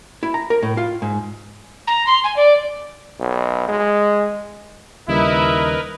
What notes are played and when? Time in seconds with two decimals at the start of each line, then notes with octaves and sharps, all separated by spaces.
0.23 E4
0.34 A#5
0.50 A#4
0.63 A2
0.77 F4
1.02 G#2
1.87 A#5
2.06 C6
2.24 G#5
2.36 D5
3.20 B1
3.68 G#3
5.08 D#2 C#3 G3 E4 A#4 B4 D#5